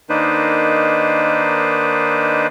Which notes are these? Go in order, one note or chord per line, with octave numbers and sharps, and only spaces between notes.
D#3 A#3 D4 D#4 B4 C5